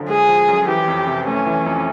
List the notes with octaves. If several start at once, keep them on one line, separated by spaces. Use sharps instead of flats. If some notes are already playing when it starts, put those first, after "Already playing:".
Already playing: F#2 D3 F3
G#3 G#4
F3
F#2
E3 G4
F2
C3
A3 C#4
E3
F2